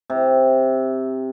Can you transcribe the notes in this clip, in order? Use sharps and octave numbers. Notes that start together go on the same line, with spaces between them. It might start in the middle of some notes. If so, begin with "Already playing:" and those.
C3